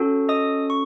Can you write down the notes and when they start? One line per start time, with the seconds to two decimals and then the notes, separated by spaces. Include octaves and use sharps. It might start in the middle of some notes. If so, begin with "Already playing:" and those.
Already playing: C#4 F#4 A4
0.29 D#5 D#6
0.70 C#6